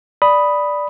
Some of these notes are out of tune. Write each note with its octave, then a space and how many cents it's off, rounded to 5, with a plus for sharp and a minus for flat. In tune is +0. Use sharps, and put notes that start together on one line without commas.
D5 +0 B5 +0 D#6 +0